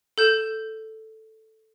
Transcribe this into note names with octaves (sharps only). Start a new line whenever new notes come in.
A4 G6 E7